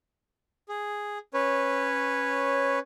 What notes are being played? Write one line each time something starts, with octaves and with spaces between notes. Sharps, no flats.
G#4
C#4 B4 C#5